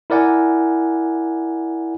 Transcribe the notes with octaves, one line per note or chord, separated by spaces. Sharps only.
E4 A#4 D5 F#5 G#5